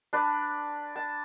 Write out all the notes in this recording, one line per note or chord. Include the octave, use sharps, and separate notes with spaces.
D4 B4
A5